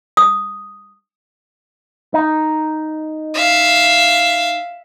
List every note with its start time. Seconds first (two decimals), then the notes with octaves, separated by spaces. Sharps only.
0.17 D#6
2.14 D#4
3.35 E5 F5